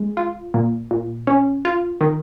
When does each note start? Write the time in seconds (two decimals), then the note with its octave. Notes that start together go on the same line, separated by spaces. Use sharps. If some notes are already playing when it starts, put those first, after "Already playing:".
Already playing: G#3
0.17 F4
0.54 A#2
0.91 A#2
1.27 C#4
1.65 F4
2.01 D#3